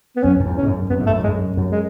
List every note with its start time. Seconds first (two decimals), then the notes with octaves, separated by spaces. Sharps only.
0.16 B3
0.23 F#2 C#4
0.40 F#2
0.46 E2
0.57 C#4
0.63 G#2
0.67 F#2
0.90 F#2 B3
1.00 G#2
1.07 A3
1.09 F#2
1.19 G#2
1.24 G#3
1.28 F#2
1.57 F#2 F#3
1.72 G#3